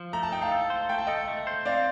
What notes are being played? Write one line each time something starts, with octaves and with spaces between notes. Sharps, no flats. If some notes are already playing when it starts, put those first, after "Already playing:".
Already playing: F3
A3 A#5
A5
D#4 G5
F5 A5
A4
C5
A3 G5
A5
A4 D#5 G5
A3
C5
C4 D5 F5